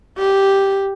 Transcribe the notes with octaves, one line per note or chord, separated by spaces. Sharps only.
G4